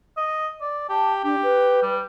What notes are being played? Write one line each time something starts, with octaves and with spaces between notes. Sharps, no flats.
D#5
D5
G4 A5
D4 G4
B4
G3